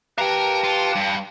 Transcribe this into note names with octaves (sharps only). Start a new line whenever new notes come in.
G4 A#4 B4 F5 G5 A5 A#5
F4
G2